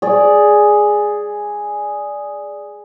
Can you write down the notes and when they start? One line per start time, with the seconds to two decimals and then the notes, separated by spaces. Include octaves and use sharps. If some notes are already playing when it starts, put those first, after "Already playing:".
0.02 G#4 D5